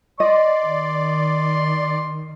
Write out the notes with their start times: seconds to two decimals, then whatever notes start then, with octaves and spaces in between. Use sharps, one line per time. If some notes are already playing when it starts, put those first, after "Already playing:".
0.20 D5 D#5 C6
0.66 D#3